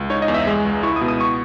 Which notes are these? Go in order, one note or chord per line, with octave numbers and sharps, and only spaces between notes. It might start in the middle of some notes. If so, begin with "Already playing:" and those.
Already playing: C#2
D#4 C#5
D#5
E2
E5
G#3
C#2
E4 C#6
D#6
B2
D#6
C#6